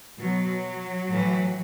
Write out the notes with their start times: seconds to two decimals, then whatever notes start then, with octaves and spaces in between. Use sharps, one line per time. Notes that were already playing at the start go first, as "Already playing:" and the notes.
0.20 B2 F#3
1.12 A2 E3